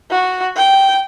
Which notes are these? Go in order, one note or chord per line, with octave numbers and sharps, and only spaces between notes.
F#4
G5